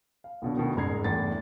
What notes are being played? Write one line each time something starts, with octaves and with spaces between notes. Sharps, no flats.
F5
B1 B2 D3
D2 B2 D#3
F#1 C2 G#2 A#5 G#6 C7
G1 E2 A2 A6